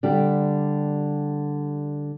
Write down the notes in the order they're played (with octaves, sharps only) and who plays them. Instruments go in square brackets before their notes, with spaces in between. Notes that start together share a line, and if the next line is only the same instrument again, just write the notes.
[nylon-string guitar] D3 G3 G4